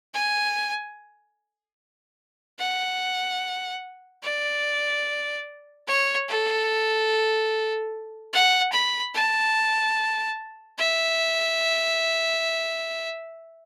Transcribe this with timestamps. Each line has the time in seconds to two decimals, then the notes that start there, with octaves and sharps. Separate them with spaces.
0.14 G#5
2.59 F#5
4.23 D5
5.87 C#5
6.28 A4
8.33 F#5
8.73 B5
9.14 A5
10.78 E5